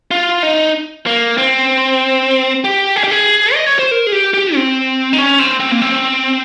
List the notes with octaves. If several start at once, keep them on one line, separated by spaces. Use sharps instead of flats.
F4
D#4
A#3
C4
G4
G#4
G4
G#4
D#5
C#5
C5
A#4
G#4
G4
G4
C4
D#4
C#4
C4
C4
A#3
C4